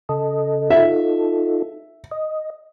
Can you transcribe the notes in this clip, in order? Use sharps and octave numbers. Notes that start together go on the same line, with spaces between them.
C#3 A4 D#5
D#4 F4 A4 E5
D#5